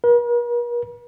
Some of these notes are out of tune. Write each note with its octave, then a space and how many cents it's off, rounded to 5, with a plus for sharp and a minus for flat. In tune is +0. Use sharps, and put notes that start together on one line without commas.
A#4 +45